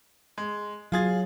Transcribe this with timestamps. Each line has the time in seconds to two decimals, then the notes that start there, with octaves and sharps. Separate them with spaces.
0.38 G#3
0.92 F#3 F4 G#4 A6